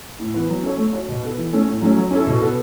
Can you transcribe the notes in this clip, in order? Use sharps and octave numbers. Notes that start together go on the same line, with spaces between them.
A2
E3 B3
F#3
C#4 A4 C#5
A3
F#4 C#5
B2
B3 A4
E3
A3 C#4 A4
A2
F#3 A3 C#4
F#3
C#4 E4 A4
B2
B3 A4